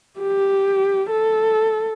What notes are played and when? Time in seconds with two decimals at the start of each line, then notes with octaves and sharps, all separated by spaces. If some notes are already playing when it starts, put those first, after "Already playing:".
0.20 G4
1.10 A4